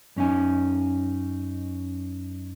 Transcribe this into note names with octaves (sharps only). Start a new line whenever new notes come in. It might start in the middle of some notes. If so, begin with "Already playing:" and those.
F#2 C#4 D#4 G#5